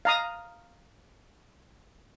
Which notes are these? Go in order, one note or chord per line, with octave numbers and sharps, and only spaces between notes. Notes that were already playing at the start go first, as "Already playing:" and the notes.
F5 A#5 D#6